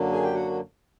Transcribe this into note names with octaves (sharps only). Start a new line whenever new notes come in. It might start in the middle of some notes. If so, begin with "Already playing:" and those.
Already playing: F#2 D3 F#3 A#3 D4
G#4 G#5
G4 G5
F#4 F#5